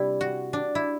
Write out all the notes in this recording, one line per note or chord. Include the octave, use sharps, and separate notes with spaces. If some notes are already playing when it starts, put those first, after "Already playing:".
Already playing: C3 G3 D4 E4
F#4
D4
E4